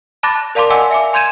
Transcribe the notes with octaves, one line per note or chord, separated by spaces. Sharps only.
A5 B5 D6 F#6 A6 A#6
A#4 D5 F5 A5 C6 D6
D#5 F5 F#5 G#5 D6 E6
E5 G#5 D6
G#5 C6 G6 G#6 D#7 E7